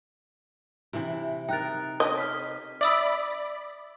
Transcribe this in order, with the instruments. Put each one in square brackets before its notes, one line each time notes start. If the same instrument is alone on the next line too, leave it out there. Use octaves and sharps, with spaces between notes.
[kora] C3 E3
[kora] D#4 A#4 [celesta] G5 F#6 A6
[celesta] C#5 [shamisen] D#5
[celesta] F6 B6
[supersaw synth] D5 B5 [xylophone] E5 D#6 E6